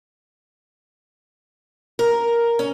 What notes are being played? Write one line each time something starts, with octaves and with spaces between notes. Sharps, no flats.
A#4
C#4